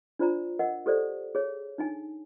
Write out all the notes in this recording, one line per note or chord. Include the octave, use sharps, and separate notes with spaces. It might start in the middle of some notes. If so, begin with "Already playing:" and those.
D4 F4 C5 D5 A#5
A#4 D#5 F#5
G4 A4 C5 D5
G#4 C#5
D4 D#4 G#5